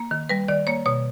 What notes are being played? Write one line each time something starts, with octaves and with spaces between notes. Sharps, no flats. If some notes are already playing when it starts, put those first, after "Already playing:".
Already playing: A#3
D#3
G3 B4
D#3 D5
A#3 C#5
B2 C#5